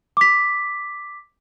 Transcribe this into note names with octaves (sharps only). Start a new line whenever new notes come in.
D6 B6